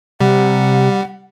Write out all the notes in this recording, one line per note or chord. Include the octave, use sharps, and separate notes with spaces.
C3 G3 F#5